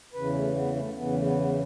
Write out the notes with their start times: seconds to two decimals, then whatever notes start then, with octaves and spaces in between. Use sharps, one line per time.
0.13 E2 C#3 E3 B4
0.34 A3
0.55 B3
0.75 A3
0.96 E2 C#3 E3 B3
1.13 A3
1.23 B3
1.39 B3